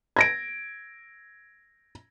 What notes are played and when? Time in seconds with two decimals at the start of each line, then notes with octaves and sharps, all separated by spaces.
0.16 G#6 A#6 D7